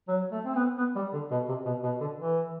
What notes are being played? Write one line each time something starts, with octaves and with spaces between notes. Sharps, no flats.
F#3
A3
C4
B3
B3
G3
D3
B2
C3
B2
B2
D3
E3